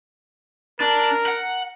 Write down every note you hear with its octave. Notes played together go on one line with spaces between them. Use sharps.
D4 A#4
F#5